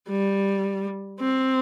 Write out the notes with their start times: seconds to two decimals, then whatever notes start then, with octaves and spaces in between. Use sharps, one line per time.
0.09 G3
1.21 C4